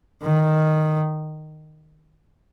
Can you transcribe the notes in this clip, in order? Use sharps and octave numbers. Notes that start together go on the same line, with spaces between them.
D#3